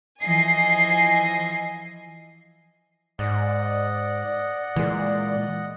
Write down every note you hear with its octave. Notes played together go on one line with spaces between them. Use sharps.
E3 F3 D#5 G#5 C7
G#2 D5 D#5 F#5
A#2 E3 G#3